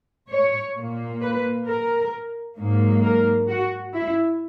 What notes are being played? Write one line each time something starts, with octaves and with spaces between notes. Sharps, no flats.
C#5
A#2 A#3
B4
A#4
G#2 F#3 A#3
A#4
F#4
E4